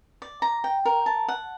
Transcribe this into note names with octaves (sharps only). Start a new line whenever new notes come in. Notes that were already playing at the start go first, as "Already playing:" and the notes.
D5
A#5
G5
A#4
A5
F#5